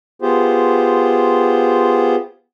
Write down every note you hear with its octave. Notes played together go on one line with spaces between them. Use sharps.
B3 F4 G4 G#4 C5